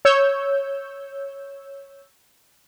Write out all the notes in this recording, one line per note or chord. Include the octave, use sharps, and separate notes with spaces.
C#5 E6 G6